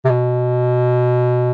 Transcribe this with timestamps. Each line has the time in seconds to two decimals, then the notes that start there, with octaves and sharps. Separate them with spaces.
0.05 C3
0.09 B2